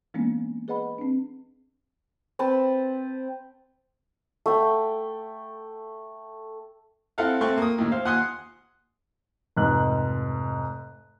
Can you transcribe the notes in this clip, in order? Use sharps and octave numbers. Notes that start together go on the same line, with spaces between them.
E3 G#3 A#3 B3 C#4 D4
G#4 B4 D#5 F#5 B5
C4 D4
C4 B4 A5 B5
A3 G5
C4 E4 A4 F5 F#5
A3 C4 C6 C#6 F#6
A#3 D#6
D#2 A2
C5 F5
D#2 F#5 G#5 C6 D#6 F#6
F1 G#2 F#6